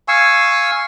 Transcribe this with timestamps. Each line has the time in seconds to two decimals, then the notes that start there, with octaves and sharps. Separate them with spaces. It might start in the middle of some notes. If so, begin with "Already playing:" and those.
0.08 F5 G#5 C#6 E6